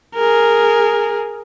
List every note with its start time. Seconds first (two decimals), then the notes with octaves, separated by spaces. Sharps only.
0.15 G#4 A#4